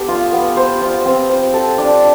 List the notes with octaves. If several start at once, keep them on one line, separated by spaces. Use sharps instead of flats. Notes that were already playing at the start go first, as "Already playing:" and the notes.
Already playing: B3 G4 A4
F4
B3
C5
F4
C4
C5
A4
D4